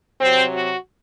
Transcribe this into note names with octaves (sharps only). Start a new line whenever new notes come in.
C3 F#3 C4
F#4